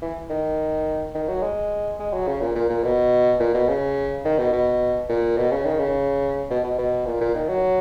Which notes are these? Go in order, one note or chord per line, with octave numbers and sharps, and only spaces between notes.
E3
D#3
D#3
F#3
G#3
G#3
F#3
C#3
A#2
A#2
A#2
B2
A#2
B2
C#3
D#3
B2
B2
A#2
B2
C#3
D#3
C#3
B2
B2
B2
A#2
A#2
D#3
F#3